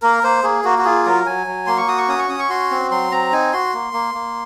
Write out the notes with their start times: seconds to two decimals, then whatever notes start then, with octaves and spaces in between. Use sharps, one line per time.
0.02 A#3 A#4
0.23 A#3 C5
0.44 A#3 G#4
0.64 A#3 F#4
0.78 F#4
0.85 F4 G#4
1.06 F#3 A#4
1.26 F#3 G#5
1.47 F#3
1.67 A#3 C6
1.78 C#6
1.88 F#4 D#6
1.98 C#6
2.08 C#4 D#6
2.19 C#6
2.29 C#4 D#6
2.39 C#6
2.49 F#4 C6
2.71 C4
2.91 F#3 C6
3.12 C4 A#5
3.32 D#4 G#5
3.53 F#4 C6
3.74 A#3
3.93 A#3
4.14 A#3